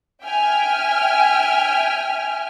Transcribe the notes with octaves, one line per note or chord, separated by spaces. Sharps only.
E5 G5 G#5 F6